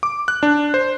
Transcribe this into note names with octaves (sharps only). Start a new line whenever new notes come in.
D6
F#6
D4
C5